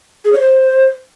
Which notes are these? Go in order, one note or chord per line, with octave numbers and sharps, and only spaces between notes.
G#4
C#5
C5